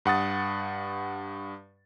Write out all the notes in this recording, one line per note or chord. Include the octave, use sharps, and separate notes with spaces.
G2 F#5 D#6 A6